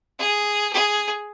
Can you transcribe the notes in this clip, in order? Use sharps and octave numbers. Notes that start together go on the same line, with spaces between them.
G#4
G#4